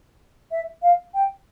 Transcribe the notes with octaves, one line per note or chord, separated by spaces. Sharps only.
E5
F5
G5